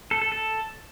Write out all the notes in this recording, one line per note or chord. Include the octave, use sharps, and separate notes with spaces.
A4
A4
A4